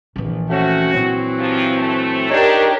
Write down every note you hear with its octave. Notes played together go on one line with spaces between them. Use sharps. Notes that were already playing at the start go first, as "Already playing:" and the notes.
A#1 E3
A3 C4 C#4 F#4
A#1 E3 F#3 C4
C3 F3
A3
D4 D#4 G4 A#4 C#5